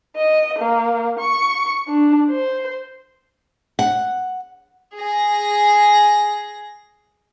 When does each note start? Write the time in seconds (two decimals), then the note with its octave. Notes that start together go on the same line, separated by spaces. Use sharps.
0.17 D#5
0.59 A#3
1.19 C#6
1.89 D4
2.30 C5
3.79 F#5
4.97 G#4 A#6